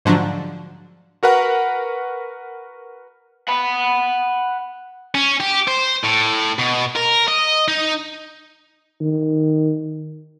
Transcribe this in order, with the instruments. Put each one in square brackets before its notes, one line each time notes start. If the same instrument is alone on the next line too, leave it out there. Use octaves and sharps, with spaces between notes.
[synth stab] G#2 D3 F3 F#3 D4
[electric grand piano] F#4 A#4 B4 F#5
[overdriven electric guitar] F#5 B5
[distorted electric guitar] C#4
G4
C5
A2
B2
A#4
D#5
D#4
[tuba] D#3